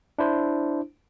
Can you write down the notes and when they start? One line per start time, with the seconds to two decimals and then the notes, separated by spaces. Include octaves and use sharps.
0.18 D4 E4 C5